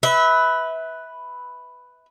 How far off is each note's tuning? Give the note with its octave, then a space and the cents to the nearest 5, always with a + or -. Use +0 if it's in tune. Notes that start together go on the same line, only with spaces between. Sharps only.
B4 +5 E5 -25